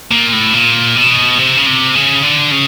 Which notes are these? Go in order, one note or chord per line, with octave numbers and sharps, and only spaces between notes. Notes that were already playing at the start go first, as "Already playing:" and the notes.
A#2
A2
A#2
B2
C3
C#3
C3
C#3
D3
C#3